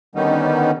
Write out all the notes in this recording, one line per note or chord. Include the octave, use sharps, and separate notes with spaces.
D3 D#3 G3 B3 C#4 D#4